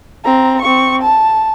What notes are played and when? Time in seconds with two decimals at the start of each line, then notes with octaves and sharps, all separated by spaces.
0.25 C4 A#5
0.62 C4 C#6
1.01 A5